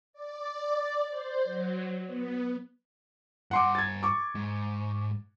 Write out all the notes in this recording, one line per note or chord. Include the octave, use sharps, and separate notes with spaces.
D5
C5
F#3
B3
G2 F#5 G#5 C6 D6
G#6 A6
C#6 D6
G#2